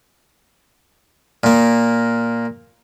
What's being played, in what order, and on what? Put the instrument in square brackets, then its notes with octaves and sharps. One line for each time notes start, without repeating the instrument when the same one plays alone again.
[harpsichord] A#2 A#3